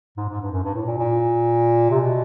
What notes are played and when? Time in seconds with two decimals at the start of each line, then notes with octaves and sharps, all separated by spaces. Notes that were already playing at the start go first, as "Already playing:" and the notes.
0.17 G#2
0.29 G#2
0.41 G2
0.52 F#2
0.64 G2
0.74 A2
0.86 A#2
0.98 A#2
1.90 C3
2.00 B2